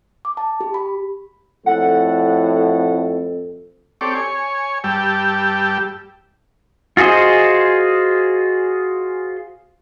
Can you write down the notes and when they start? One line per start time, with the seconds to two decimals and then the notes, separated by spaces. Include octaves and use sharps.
0.25 D6
0.37 A5
0.60 G4
0.74 B5
1.66 F2 A2 A4 F#5
4.01 C4 G4 A4 C#5 D5
4.15 C#5 G#5
4.84 G2 G3 G4 G5 A5 E6
6.97 F4 F#4 G#4 C5 D#5